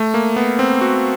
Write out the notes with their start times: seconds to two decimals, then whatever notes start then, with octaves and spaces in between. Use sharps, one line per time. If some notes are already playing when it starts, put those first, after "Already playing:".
Already playing: A3
0.14 A#3
0.36 B3
0.59 C4
0.81 F#4